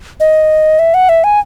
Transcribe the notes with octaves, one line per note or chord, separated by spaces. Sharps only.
D#5
E5
F#5
E5
G#5